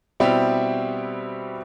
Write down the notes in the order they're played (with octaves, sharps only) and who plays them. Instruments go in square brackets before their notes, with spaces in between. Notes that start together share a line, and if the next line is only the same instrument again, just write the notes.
[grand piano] B2 G3 C4 E4 G4